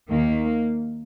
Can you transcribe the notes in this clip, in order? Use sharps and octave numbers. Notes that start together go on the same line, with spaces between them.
D#2 D#3 A#3